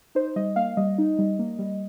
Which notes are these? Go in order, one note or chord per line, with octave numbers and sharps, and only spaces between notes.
D#4 C5
G3 D#5
A#3 F5
G3 D#5
D#4
G3
A#3
G3